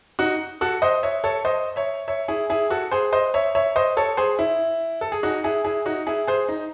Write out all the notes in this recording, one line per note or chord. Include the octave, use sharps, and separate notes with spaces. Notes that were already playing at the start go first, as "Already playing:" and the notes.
D#4 F#4
F#4 A4
C5 D#5
C#5 E5
A4 C#5
C5 D#5
C#5 E5
C#5 E5
E4 G#4
E4 G#4
F#4 A4
G#4 C5
C5 D#5
C#5 E5
C#5 E5
C5 D#5
A4 C#5
G#4 C5
E4
A4
G#4
D#4 F#4
E4 G#4
E4 G#4
D#4 F#4
E4 G#4
G#4 C5
D#4